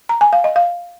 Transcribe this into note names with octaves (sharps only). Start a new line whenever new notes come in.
A#5
G#5
F5
D#5
F5